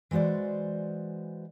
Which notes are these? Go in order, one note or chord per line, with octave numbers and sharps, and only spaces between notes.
E3 G#3 F#4 C5 D5